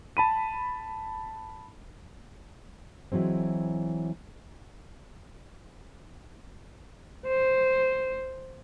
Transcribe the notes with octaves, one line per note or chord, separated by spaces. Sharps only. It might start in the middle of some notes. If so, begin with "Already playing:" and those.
A5 B5 D#7
E3 F#3 G#3 C4
C5